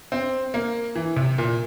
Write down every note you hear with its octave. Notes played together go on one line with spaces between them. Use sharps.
C4
A#3
E3
C3
A#2